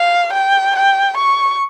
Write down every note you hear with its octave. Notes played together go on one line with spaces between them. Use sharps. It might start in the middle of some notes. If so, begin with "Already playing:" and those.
Already playing: F5
G5
G5
C#6